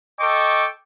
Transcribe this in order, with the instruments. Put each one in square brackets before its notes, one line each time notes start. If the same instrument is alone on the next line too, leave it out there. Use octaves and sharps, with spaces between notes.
[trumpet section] A4 D#5 G5 C#6 D6